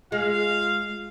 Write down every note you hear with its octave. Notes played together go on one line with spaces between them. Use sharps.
G#3 F4 F5